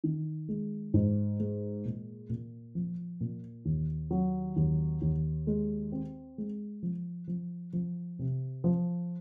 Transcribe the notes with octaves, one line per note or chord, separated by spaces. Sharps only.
D#3
G#3
G#2
G#3
A#2
A#2
F3
A#2
D#2
F#3
D#2
D#2
G#3
C4
G#3
F3
F3
F3
C3
F3